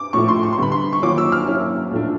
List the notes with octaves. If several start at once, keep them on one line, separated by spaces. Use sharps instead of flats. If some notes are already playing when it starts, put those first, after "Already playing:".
Already playing: D6
A2 F3 A3 C#6
C6
C#6
C6
D3 G3 B3 B5
C6
C#6
D#3 F#3 A#3 C#4 F4 D6
E6
F6
F#3 A#3 C#4 E4
A2 F3 A3 D4